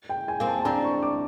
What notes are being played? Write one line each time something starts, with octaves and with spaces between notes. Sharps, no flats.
G5
G#5
A#3 C4
A5
A5
C4 D4 A#5
C#6
D6